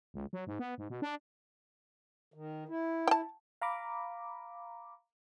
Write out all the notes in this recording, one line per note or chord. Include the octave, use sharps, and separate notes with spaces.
C#2
F#3
G#2
B3
G#2
B2
D4
D#3
E4
G5 A5
F5 A#5 B5 D6